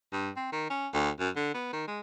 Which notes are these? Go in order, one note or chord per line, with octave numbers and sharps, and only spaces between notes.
G2
C4
D#3
C#4
D2
F#2
D3
B3
D#3
G#3